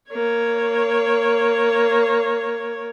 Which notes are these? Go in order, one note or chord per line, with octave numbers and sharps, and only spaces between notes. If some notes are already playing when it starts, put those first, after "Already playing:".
A#3 C#5